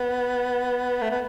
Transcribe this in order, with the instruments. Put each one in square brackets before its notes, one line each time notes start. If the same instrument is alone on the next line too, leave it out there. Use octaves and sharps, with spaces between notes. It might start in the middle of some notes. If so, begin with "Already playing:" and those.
Already playing: [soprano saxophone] B3
A3
B3